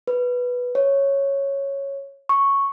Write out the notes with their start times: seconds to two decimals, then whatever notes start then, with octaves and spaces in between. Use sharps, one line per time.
0.07 B4
0.75 C#5
2.29 C#6